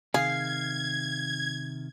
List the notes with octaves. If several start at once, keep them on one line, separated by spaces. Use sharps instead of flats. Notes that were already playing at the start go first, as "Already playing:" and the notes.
C3 D#3 G#4 F5 G#6